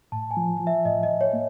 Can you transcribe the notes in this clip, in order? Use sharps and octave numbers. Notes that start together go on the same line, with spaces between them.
A2 A5
G#5
F3
F3
E5
A2 D#5
D#5
A2
C#5
A#3